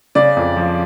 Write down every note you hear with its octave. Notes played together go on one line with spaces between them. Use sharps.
C#3 D5
F2
F3